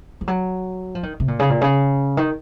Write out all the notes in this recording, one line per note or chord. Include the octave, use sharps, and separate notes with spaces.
F3
F#3
F3
D#3
C3
A#2
C#3
A#2
C#3
D#3